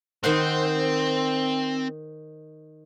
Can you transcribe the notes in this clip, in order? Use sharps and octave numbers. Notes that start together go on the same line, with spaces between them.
D#3 C4 C5 F#5